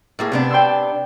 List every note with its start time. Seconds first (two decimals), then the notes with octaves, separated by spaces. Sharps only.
0.19 A2 A#3 G#4
0.32 C3 B3 D4
0.51 G5 C6 E6